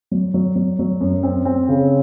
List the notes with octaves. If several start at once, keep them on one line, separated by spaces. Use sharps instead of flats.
F#3
F#3
F#3
F#3
F#2
C4
C4
C#3